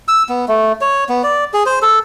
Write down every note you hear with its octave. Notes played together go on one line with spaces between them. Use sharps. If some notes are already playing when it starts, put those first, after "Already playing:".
E6
B3
A3
C#5
B3
D5
G#4
C5
A4